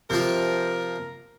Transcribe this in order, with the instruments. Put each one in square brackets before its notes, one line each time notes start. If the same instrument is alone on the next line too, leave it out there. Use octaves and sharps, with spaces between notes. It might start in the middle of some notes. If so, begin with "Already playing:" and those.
[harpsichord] C3 F3 F4 [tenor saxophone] A#4